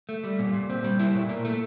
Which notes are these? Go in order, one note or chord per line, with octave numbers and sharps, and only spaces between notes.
A3
G3
A#2
A#2
C4
G3
E4
A#2
A#3
A3